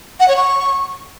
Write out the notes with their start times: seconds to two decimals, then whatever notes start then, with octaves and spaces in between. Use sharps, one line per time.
0.20 F#5
0.28 C#5
0.37 C#6